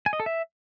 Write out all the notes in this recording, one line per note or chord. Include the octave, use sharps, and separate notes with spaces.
G#5
D#5
A4
E5